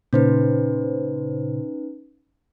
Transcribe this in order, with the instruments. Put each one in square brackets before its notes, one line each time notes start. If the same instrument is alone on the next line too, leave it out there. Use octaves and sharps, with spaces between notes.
[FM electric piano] A#2 C#3 C5 [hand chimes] C#4 D#4 B4